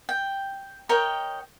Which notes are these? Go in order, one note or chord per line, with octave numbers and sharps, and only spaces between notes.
G5
A#4 C#5 D#5 G5